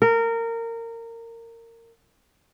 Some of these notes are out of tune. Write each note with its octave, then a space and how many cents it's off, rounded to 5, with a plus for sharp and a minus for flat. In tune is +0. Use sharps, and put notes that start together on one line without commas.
A#4 -20